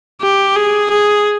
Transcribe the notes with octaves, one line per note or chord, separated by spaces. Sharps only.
G4
G#4
G#4